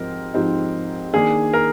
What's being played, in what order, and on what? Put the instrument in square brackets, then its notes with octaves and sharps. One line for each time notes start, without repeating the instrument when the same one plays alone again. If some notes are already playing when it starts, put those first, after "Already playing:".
Already playing: [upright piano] G#2 F3 C4 D#4 G4 [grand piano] A#4
[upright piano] G#2 F3 C4 D#4 G4
[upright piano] D#3 A#3 D4 [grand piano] G#4
[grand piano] A#4